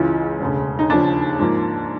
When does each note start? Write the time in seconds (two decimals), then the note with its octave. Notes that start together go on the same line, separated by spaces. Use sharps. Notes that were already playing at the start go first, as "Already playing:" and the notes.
Already playing: C#2 C#3 E3 F4
0.40 E1 D2 C#3
0.79 D#4
0.89 D#2 C#3 F3 D4
1.39 G#2 F3 A#3